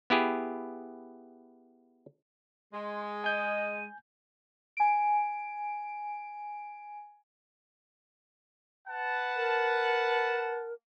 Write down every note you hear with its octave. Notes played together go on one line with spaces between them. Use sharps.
B3 E4 G4 G#4
G#3 C6
D#5 G#5 G6 D#7
G#5 D7
B4 F#5 A5
A#4